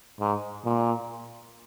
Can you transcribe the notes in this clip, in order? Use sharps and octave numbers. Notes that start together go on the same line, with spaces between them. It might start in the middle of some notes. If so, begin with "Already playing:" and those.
G#2
A#2